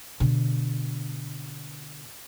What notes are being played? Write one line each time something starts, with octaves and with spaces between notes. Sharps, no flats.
B2 D3